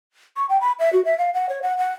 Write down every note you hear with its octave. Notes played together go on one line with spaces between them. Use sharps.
C#6
G5
B5
E5
F#4
E5
F5
F#5
C#5
F#5
F#5